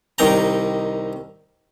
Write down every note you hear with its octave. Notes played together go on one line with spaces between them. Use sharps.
C2 D#3 G5 A#5